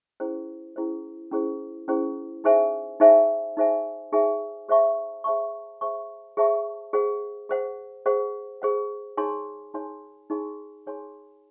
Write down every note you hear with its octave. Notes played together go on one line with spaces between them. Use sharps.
C#4 E4 G#4 C5
C#4 E4 G#4 C5
C#4 E4 G#4 C5
C#4 E4 G#4 C5
D#4 G#4 C5 E5 G#5
D#4 G#4 C5 E5 G#5
D#4 G#4 C5 E5 G#5
D#4 G#4 C5 E5 G#5
G#4 C5 E5 A5 C#6
G#4 C5 E5 A5 C#6
G#4 C5 E5 A5 C#6
G#4 C5 E5 A5 C#6
G#4 C5 F#5
G#4 C5 F#5
G#4 C5 F#5
G#4 C5 F#5
D#4 G#4 C#5 G#5 C6
D#4 G#4 C#5 G#5 C6
D#4 G#4 C#5 G#5 C6
D#4 G#4 C#5 G#5 C6